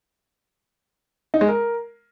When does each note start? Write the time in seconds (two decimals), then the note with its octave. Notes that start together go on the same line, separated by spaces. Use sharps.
1.34 D#4
1.41 G#3
1.48 A#4